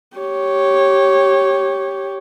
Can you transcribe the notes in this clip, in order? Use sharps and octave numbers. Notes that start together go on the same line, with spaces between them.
G4 C#5